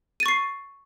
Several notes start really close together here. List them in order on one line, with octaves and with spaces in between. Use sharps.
D#7 A6 C#6 C7